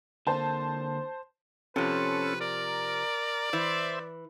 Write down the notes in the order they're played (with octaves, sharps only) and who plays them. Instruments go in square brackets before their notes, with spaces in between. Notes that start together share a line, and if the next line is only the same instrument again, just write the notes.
[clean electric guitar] D3 A#3 C4 [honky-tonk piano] C5 A5
[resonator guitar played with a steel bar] C3 F3 [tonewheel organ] C#4 A4 [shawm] B4
[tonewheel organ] A#4 [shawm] D5
[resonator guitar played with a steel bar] E3 [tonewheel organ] C5 E5